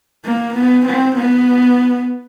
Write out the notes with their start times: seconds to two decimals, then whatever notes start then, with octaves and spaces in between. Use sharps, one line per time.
0.25 A#3
0.55 B3
0.86 C4
1.16 B3